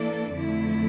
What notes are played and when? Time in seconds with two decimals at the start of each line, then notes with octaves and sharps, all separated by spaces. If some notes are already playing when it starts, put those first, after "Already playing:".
Already playing: E3 A#3 D4 A4 D5
0.32 F2 D3 A3 E4